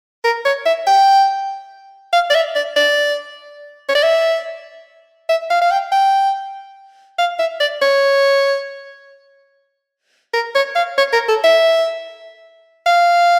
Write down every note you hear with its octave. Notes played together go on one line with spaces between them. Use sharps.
A#4
C#5
E5
G5
F5
D5
E5
D5
D5
C#5
D5
E5
E5
F5
F5
G5
G5
F5
E5
D5
C#5
A#4
C#5
F5
C#5
A#4
A4
E5
F5